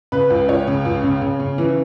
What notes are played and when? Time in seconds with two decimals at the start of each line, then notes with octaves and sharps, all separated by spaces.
0.12 C#3 B4
0.30 C#2
0.48 C#2 C#5
0.67 C#3
0.85 C#2
1.03 C#3
1.22 C#3
1.40 C#3
1.58 E3